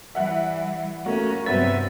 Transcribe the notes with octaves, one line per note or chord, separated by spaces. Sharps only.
E3 G3 E5 F#5 F#6
A3 A#3 C#4 F#4
G2 C3 F#3 B3 C4 B4 E5 A6